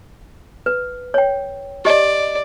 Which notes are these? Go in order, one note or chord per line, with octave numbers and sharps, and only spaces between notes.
B4
C#5 G5
G4 D5 D#5